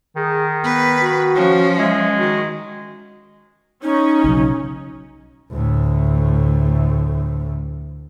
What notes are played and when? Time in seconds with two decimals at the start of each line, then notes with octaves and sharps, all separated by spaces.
0.16 D#3 G#4
0.64 B3 B4
1.00 F#4
1.35 F3 C#4
1.79 G#3 E5
2.18 D#3 F#4
3.83 C#4 D#4
4.24 B1 C#3 F#3
5.52 D2 A2